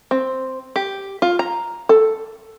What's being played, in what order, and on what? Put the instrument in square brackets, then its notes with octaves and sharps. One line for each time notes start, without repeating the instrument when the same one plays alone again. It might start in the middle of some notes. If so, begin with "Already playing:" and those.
[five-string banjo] C4
G4
F4
A#5
A4